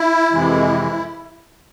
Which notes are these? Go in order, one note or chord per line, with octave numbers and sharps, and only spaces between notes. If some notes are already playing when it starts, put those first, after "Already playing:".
Already playing: E4
F2 C3 E3 G#3